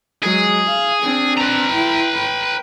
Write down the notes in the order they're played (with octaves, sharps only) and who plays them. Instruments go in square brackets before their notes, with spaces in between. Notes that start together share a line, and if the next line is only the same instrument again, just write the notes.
[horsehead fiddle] F#3 G#3 [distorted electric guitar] G#4
[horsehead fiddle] F5
C4 D4
[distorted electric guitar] B4 A#5
[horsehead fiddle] E4 G5
G5